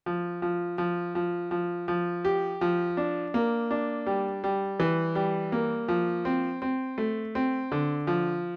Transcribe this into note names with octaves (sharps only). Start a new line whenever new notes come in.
F3
F3
F3
F3
F3
F3
G4
F3
D4
A#3
D4
G3
G3
E3
G3
A#3
F3
C4
C4
A3
C4
D3
F3